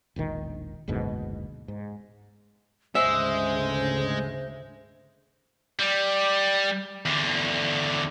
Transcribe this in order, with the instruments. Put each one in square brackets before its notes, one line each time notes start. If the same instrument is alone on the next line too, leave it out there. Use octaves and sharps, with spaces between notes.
[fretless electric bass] E1 A#1 D#3
F#1 D2 G#2 B2
G#2
[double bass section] G#1 D2 C#3 [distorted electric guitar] G#3 [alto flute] C5 [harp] E5
[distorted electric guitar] G3
E2 D3